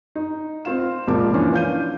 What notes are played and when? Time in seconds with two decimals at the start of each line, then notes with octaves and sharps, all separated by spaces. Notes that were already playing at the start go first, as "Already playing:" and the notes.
0.15 D#4
0.65 C4 F4 F5 E7
1.08 C#2 A#2 F3 A#4 A5 D6
1.34 E3 F3 A#3 C#4 D4
1.54 F5 G6 D#7